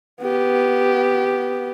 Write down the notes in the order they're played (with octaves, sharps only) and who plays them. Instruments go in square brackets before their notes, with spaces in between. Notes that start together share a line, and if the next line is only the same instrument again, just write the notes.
[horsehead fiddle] B3 G4